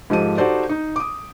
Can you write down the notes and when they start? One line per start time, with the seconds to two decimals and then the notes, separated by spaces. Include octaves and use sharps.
0.10 G#2 F3 G4 A4 D#7
0.37 D#4 F#4 G4 A4 C5 D5
0.69 D#4
0.96 D6 D#6